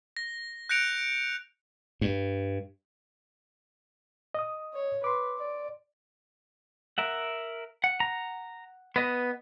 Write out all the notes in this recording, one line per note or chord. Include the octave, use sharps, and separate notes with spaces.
A#6
F#6 G6 A#6 C#7 D7 F7
G2
D#5 D#6
C#5
B4 C6 D6
D5
A#4 E5 F#5
F#5
A#5
B3 B4 D#5